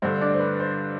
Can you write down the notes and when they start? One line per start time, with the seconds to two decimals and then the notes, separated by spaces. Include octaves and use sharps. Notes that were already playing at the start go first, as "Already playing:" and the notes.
0.02 G2 D3 C5
0.21 D4 D5
0.34 C5
0.39 B4
0.60 C5